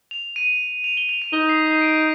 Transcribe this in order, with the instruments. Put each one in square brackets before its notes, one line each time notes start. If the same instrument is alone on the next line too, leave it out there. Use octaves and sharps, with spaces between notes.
[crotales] F7
D#7
F7
G7
F7
D#7
[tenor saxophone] D#4 [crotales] G7
[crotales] C7
C7
D7